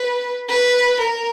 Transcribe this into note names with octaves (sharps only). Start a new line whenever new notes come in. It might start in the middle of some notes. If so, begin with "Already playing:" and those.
Already playing: B4
B4
A#4